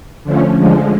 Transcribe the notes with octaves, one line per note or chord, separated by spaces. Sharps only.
D3 F3 A3 C#4
D3 F3 G#3